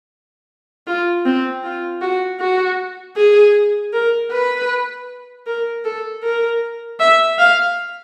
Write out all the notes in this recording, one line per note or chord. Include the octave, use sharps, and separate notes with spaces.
F4
C4
F4
F#4
F#4
G#4
A#4
B4
A#4
A4
A#4
E5
F5